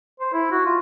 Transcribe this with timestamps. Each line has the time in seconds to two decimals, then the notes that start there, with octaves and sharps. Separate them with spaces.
0.20 C5
0.33 E4
0.51 F#4
0.65 F4